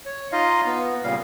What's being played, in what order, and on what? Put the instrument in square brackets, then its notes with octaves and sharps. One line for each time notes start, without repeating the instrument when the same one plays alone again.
[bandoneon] C#5
D#4 F4 D#5 F5
B3
A#2 C#3 G3 F5